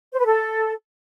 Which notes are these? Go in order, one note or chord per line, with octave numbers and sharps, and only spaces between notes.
C5
B4
A4